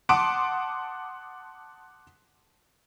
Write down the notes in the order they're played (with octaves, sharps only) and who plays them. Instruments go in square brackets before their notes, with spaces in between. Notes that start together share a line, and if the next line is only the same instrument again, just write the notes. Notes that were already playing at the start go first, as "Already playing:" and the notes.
[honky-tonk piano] F#5 A5 C6 D6 D#6 D7